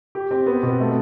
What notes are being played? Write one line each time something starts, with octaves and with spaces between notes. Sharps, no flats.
G4
C4
B3
B2
A3